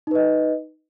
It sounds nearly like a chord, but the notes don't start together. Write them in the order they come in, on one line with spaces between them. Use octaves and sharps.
D#4 B4 D#5